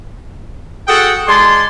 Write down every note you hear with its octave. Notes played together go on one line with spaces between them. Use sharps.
F#4 G#4 A4 F#5 G5
G#3 D5 A5 C6